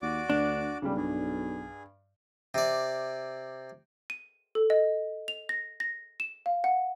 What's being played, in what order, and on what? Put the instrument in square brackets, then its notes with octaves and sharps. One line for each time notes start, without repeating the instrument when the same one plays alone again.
[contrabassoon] D#2 [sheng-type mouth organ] F#4 D5 D6
[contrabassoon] D2 [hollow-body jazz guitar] D4
[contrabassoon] B1 [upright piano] C#3 G3
[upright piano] G2 [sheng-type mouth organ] G#4
[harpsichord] C3 D5
[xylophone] D#7
A4
D#5
F7
A#6
A#6
E7
F5
F#5